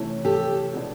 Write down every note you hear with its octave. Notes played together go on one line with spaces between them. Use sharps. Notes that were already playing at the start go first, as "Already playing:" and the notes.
Already playing: C3 E3 A3 C#4 E4
G4 A4
B2 G#3 B3 D4